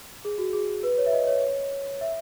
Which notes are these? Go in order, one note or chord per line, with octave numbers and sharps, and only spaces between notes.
G#4
F#4
G#4
B4
C#5
E5
D#5
C#5
E5